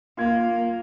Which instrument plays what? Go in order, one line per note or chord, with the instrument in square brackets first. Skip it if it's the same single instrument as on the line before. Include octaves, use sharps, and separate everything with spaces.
[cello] A#3 [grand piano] F4 G#6